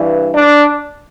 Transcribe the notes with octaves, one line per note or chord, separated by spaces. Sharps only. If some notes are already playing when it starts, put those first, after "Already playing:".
Already playing: G2 E3
D4